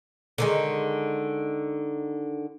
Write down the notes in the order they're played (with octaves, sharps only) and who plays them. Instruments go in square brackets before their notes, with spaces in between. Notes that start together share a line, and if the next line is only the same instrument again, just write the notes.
[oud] D3 D#3 G#3